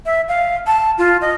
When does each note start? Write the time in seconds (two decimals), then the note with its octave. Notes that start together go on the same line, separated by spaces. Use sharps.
0.06 E5
0.28 F5
0.67 A5
0.98 F4
1.21 D#5